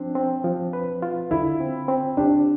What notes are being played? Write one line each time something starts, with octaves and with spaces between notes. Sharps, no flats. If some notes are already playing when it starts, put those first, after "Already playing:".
Already playing: F3 C4 D4
C4
F3
B4
F4
D3 E4
C4
C4
D4 G4